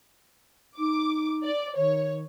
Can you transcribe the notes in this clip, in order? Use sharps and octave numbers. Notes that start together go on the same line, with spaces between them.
D#4 D6
D5
D#3 C#5